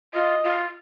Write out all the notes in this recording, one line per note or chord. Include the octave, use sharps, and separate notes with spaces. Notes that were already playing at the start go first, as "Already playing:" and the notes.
F4 D#5
F4